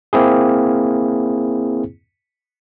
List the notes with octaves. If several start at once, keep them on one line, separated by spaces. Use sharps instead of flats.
A#3 C4 E4 G#4